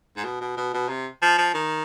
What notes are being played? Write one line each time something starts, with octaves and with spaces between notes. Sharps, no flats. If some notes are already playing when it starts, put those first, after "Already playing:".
G#2
B2
B2
B2
B2
C3
F3
F3
D#3